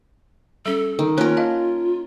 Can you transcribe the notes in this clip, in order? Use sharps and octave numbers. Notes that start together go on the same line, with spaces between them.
G3 C#4 A4
D#3
A#3 C#4 F4 A#4
D#5 F5 A5